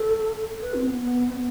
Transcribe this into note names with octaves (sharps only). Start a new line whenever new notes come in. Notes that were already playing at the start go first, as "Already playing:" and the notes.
Already playing: A4
B4
C4
B3
B3
C4
B3